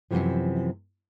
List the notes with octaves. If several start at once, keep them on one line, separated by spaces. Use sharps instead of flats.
F#2 A2 C3 E3 F3